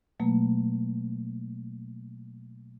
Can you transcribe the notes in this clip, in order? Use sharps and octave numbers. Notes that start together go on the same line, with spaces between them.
B2 F#3 A3 A#3